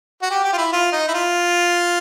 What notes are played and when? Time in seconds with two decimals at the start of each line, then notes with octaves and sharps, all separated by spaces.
0.23 F#4
0.31 G4
0.44 G4
0.53 F4
0.58 E4
0.73 F4
0.92 D#4
1.08 E4
1.14 F4